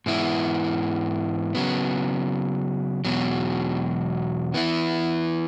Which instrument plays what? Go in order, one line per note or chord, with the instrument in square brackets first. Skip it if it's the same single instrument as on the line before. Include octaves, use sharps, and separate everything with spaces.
[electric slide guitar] G#2 E3 B3 E4
C#3 F#3 B3
E2 B2 F#3
E3 B3 E4